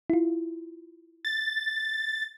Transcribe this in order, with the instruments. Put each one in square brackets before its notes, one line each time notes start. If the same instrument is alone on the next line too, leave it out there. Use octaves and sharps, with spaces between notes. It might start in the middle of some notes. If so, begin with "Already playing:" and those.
[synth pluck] E4 F4
[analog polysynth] A6